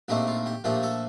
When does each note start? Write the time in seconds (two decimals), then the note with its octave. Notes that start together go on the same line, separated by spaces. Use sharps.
0.08 A#1 A#2 A3 C4 D#4 G4
0.27 F4
0.46 G4
0.64 A#1 A#2 F3 A3 G4
0.83 A4